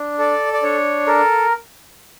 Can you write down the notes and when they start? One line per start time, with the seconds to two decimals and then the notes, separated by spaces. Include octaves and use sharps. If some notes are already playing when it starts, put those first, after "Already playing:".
Already playing: D4
0.19 A4 D5
0.53 D5
0.63 D4 C#5
1.07 A4 A#4